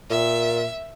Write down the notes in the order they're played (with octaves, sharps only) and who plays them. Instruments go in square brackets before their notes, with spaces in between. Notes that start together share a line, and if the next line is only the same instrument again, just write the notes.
[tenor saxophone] A#2 [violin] E5